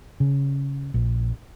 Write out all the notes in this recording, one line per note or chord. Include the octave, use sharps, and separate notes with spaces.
C#3
A#1